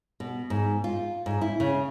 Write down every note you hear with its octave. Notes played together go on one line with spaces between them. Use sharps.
B2
G#2
F4
G#2
E4
C#3